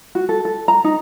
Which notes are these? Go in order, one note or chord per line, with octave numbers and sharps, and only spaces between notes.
F#4
A4
A4
A#5
D#4